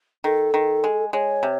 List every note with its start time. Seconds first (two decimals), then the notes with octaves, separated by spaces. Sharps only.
0.24 D#3 A4
0.54 D#3
0.84 G#3
1.13 G#3 C#5
1.43 C3